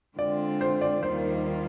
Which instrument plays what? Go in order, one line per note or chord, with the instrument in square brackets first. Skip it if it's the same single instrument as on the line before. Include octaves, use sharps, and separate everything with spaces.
[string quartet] D3 G#3 C4 F4 [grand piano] D5
[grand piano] C5
D5
[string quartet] D#2 D#3 G3 A#3 F4 [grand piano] C5